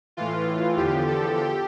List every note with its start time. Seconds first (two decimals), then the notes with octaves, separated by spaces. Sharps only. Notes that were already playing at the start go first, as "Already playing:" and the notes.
0.17 A2 E3 F4
0.77 E2 D3 F3 G4
1.08 A4
1.37 G4